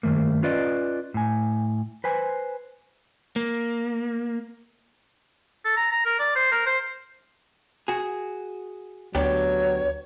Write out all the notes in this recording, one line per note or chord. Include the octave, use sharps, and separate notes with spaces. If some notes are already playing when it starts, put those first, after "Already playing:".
G2 D#3 A3 A#3
C#4 F4 B4 D5 D#5
A2 G#5
B4 C5 G#5
A#3
A4
A#5
A#5
A#4
D5
C5
A#4
C5
F#4 G#4
D2 F#3 B3 D4 G4 C#5